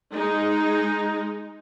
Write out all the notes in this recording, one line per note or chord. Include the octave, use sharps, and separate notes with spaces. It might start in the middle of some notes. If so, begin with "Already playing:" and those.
G#3 D#4